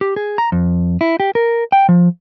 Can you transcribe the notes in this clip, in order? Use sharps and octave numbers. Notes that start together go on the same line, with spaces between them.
G4
G#4
A#5
F2
E4
G4
A#4
G5
F3